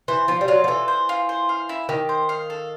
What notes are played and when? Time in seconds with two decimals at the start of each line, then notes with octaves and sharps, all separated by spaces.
0.08 E3 C5
0.28 F3 F4
0.41 G3
0.48 F#3 F4
0.64 F3
0.68 E3 A4
0.88 C5
1.09 F4
1.29 C5
1.49 F5
1.69 E4
1.89 D#3 G4
2.09 C5
2.29 F5
2.50 A4